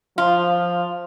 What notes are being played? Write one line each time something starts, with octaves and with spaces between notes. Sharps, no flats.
F3 F4